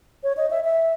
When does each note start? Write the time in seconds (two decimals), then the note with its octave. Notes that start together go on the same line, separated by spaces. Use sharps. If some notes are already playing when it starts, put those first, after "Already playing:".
0.23 C#5
0.37 D#5
0.51 E5
0.64 E5